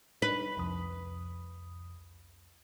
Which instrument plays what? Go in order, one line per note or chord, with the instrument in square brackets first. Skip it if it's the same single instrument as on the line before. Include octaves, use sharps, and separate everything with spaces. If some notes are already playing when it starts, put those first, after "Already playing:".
[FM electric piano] D4 D#4 [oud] B4
[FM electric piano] C2 F2 D#6